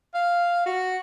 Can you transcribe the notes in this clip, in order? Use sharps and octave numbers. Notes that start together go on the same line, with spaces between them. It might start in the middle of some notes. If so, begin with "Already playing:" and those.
F5
F#4